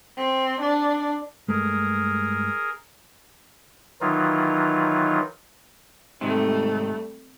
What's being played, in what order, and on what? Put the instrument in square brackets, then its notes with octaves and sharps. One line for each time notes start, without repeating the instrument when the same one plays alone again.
[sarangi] C4
D4
[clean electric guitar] G2 G#3 A3 [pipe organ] G#4 A#4
[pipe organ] D#3 E3 F#3 D#4 F4
[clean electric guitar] G#2 C3 D#3 [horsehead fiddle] G3 A3 [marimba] C4